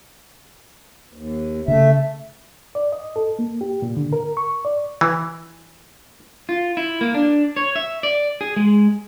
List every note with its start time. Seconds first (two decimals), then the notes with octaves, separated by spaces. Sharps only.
1.14 D#2
1.68 C#3 A3 E5
2.75 D5
2.92 D#5
3.16 A4
3.39 A#3
3.61 G4
3.82 A#2
3.97 D3
4.13 A#4
4.37 C#6
4.65 D5
5.01 E3
6.49 F4
6.77 E4
7.01 A#3
7.15 D4
7.57 C#5
7.76 E5
8.03 D5
8.41 G#4
8.56 G#3